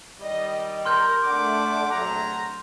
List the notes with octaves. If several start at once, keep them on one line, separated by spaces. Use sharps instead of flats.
D#3 G3 D#5
A#4 C6 F6 G6
A3 D4 F#5 D6
A#1 C3 F#3 A#5